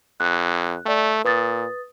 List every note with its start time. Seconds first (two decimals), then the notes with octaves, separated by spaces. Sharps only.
0.20 F2 F#6
0.86 A3 D5 G5
1.25 A#2 B4 D#6 A6